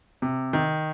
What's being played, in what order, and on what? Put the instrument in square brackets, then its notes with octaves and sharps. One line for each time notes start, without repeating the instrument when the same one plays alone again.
[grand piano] C3
D#3